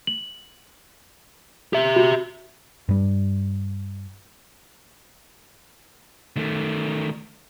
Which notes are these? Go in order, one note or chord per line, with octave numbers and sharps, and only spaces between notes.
F#7
G4 E5
F#4
G2 G3
D#3 A3